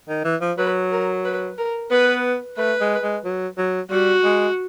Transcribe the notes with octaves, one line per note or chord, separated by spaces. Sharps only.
D#3
E3
F3
F#3 B4
A#4
B4
A#4
B3 B4
A3 B4
G#3
G#3
F#3
F#3
G3 F#4
G#3